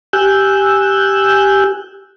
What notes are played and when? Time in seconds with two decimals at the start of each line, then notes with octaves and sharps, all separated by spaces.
0.13 G4 G#5 E6 F#6 G6